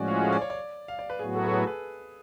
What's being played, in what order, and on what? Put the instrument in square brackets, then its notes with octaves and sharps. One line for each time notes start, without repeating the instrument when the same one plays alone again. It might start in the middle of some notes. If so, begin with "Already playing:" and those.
Already playing: [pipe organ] A2 F3 G#3 C#4 F#4 [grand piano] D5
[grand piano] F5
F5
D5
C#5
D5
F5
D5
B4
[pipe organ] A2 F#3 B3 F#4 [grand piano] G#4
[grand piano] A4
A4
G#4
B4